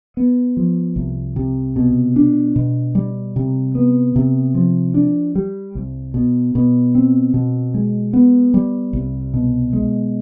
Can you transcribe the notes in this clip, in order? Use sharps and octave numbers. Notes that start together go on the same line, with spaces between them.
B3
F3
C2
C3
B2
D4
B2
G3
C3
B3
C3
F3
D4
G3
C2
B2
B2
C4
B2
G#3
B3
G3
C2
B2
G#3